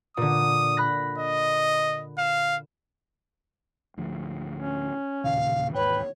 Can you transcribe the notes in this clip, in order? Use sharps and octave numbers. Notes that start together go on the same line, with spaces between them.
A#2 D3 D#6
B5 F#6 A#6
D#5
F5 E7
D1 D2 F3
C#4
E1 D#2 A#2 C#3 F5
G#2 B4 C#5 G5